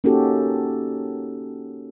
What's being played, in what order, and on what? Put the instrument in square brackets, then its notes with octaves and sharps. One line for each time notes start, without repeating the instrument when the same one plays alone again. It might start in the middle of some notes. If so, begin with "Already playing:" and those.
[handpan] A#3 C#4 D#4 F#4 G4 A4